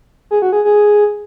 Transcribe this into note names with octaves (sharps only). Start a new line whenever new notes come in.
G#4
F#4
G#4
G#4